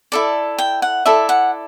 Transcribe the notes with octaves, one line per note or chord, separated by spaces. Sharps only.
E4 A4 D5
G5
F#5
E4 A4 D5 E5
F#5